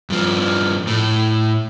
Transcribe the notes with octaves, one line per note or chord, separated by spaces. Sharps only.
G2 F3
A2